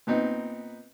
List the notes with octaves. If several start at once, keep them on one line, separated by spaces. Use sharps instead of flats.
A#2 B3 C4 D#4